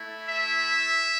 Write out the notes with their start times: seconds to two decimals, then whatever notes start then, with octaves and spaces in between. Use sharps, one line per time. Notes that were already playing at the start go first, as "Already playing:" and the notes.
Already playing: A3 E4
0.29 E5